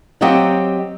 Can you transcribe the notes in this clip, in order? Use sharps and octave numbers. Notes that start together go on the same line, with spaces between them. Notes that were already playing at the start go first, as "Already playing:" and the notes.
F#3 C4 G4 D#5 F5 F#5